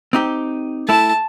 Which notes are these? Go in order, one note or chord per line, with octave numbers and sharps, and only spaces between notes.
C4 D#4 G4
A3 E4 A5